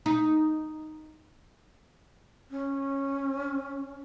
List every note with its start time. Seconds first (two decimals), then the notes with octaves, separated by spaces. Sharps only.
0.06 D#4
2.50 C#4